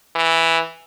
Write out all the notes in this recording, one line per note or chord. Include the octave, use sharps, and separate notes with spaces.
E3